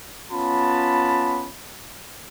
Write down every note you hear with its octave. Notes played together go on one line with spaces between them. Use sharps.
B3 C#4 F4 A5 B5